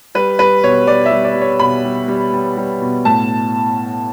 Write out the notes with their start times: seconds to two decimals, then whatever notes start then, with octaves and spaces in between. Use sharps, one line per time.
0.15 G3 B4
0.39 G3 B4
0.63 B2 C#5
0.87 G3 D5
1.06 E5
1.12 G3
1.24 D5
1.35 G3
1.41 C#5
1.60 B2 B5
1.84 G3
2.08 G3
2.33 G3
2.57 G3
2.81 B2
3.05 A2 A5